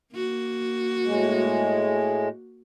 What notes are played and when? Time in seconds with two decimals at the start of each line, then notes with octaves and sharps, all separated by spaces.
0.15 A#3 F#4
1.05 A2 G#3